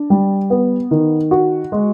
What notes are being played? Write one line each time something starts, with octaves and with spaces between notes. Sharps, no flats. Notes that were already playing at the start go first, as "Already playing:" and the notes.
Already playing: D4
G3
B3
D#3
F#4
G#3